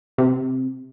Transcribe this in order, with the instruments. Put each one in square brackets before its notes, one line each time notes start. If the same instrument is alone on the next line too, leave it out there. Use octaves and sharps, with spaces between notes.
[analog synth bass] C3